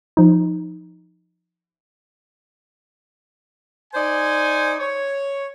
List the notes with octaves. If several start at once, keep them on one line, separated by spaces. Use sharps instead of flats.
F3 D#4
D#4 C5 D5 G#5
C#5